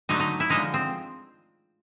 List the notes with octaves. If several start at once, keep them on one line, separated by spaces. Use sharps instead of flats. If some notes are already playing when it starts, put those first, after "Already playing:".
D3 F#3 A3 D#4
D#4
E4
D3 F3 G#3 D#4
C4